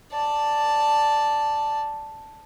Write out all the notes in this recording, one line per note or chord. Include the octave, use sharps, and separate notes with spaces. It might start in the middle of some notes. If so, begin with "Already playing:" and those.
D5 A5